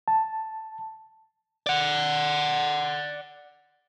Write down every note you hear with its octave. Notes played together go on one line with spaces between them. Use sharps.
A5
D5 F#5